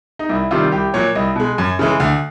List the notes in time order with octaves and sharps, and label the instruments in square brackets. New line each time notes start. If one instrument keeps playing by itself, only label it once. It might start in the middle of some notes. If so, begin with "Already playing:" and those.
[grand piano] D#4
C2 E4
C3 D#3 G3 F4
C2 G4
A#2 F#3 C#5
C2 D#5
B2 G#3
F#2
C#3 E3 G#3
D2